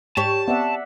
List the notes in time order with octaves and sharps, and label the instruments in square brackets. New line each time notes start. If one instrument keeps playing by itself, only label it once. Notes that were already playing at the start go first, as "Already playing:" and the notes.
[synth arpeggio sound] G#2 [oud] G4 C#5 [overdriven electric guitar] A5
[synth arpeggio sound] B3 C4 [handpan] D5 E5 F#5